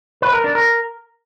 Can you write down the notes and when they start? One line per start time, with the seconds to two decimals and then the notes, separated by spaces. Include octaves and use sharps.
0.22 B4
0.33 A#4
0.44 D4
0.55 A#4